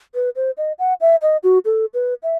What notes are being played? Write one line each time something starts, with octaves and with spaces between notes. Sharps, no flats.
B4
C5
D#5
F#5
E5
D#5
F#4
A4
B4
E5